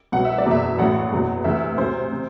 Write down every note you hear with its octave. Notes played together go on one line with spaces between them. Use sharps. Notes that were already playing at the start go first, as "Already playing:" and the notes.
C2 B2 F#3 F#5
E5
D5
F#1 E2 B2 E5
A1 A2 F#3 F#5
F#1 E2 B2 F#3
D2 C3 E3 E5
D2 C3 F#3 C5
C3